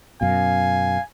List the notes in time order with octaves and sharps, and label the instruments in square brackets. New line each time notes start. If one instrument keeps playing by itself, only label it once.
[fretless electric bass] F#2 B2 [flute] F5 [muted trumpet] G#5